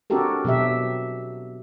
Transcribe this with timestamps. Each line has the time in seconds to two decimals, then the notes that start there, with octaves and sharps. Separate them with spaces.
0.10 C4 D4 F#4 G4 A4 A#4
0.45 B2 F#3 G4 E5